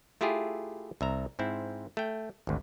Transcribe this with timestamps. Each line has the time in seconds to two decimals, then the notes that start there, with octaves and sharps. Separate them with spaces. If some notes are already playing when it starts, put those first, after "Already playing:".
0.21 A3 E4 F4 G4 G#4
1.01 C2 E5 A#5
1.39 G#2 C4 E4
1.97 A3 G5
2.47 G#1 D2